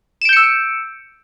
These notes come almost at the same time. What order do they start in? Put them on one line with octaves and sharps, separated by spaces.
E7 D7 G6 C#7 E6